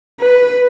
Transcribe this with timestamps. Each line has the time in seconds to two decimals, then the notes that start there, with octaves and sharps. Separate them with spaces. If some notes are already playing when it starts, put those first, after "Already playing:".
0.20 B4